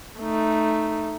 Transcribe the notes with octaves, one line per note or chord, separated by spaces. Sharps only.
A3 D#4